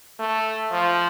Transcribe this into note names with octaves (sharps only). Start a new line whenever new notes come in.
A3
F3